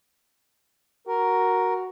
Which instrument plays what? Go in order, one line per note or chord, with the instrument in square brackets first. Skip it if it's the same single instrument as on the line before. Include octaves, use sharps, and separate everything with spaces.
[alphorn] F#4 [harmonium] A#4